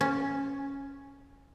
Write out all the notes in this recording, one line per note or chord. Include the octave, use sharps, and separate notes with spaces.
C#4